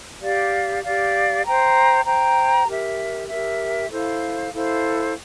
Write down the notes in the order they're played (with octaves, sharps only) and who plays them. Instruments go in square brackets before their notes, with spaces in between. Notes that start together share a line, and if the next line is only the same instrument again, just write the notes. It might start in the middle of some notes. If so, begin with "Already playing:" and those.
[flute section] G4 D5 F5
G4 D5 F5
C5 G5 A#5
C5 G5 A#5
G4 A#4 E5
G4 A#4 E5
E4 A4 C5 F5
E4 A4 C5 F5